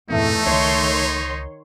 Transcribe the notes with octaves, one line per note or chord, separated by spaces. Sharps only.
E2 G2 A#2 A3 C4 D#4
C#2 D#3 C#5 C6